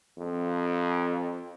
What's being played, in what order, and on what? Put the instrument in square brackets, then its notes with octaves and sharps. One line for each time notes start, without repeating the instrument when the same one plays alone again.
[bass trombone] F2